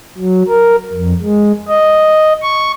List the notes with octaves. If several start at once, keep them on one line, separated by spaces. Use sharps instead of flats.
F#3
A#4
F2
G#3
D#5
C#6